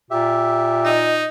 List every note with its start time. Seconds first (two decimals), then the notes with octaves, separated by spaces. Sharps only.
0.11 A#2 G4 E5
0.85 D#4 D#5